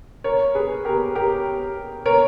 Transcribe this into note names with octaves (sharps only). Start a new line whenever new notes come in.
A#4 C#5
G#4 B4
G4 A#4
G4 A#4
A#4 C#5